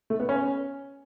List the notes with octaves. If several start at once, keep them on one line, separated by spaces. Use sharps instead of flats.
A3
B3
C#4